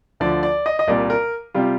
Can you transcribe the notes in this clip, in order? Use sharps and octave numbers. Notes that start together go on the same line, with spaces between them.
D2 D3 F3 D5
D5
D#5
D#5
C2 A#2 G3 D5
A#4
C3 G3 F4